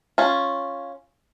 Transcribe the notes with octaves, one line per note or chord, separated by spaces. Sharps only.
C#4 F4